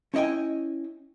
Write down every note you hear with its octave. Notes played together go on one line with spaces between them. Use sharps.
C#4 E4 D#5 G5 G#5